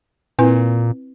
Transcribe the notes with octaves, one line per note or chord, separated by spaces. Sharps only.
A#2 C4 E4 B4